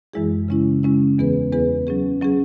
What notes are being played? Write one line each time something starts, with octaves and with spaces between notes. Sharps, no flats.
F#2 E3 G#3 E4 G#4
C#3 G#3 C#4 E4
C#3 G#3 C#4 E4
E2 E3 B3 G#4 B4
E2 E3 B3 G#4 B4
F#3 C#4 G#4
F#3 C#4 G#4